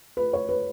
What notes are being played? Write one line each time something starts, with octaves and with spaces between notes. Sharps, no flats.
B4
C#5
B4